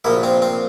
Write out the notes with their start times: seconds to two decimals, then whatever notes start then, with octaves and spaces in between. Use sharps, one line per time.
0.04 A#1 A#2 F3 E4
0.23 C4
0.42 C4